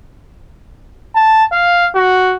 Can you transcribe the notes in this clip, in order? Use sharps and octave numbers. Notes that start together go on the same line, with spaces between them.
A5
F5
F#4